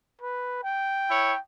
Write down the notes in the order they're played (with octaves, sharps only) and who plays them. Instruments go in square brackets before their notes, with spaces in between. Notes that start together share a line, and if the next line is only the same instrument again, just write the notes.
[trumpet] B4
G5
[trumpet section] E4 C#5